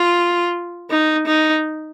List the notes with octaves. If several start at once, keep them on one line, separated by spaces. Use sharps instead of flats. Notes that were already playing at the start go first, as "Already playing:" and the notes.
Already playing: F4
D#4
D#4